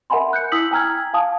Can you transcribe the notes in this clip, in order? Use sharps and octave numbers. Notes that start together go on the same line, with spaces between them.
A#4 E5 F#5 G#5 B5 C6
F#6 G6 C#7
E4 D#6 E6 B6 F#7
G5 G#5 A#5 E6 F6 G#6
F5 G#5 A5 D#6